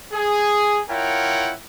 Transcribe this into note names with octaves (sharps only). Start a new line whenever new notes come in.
G#4
E4 F4 A#4 C#5 F#5 G5